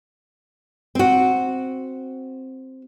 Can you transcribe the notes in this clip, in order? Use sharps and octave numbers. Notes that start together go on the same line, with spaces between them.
C4 F#4